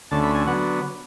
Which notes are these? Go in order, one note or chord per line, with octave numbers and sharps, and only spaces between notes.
D2 D3 A3 C#4 A5
B5
G#5
D3 F#3 B3 F#5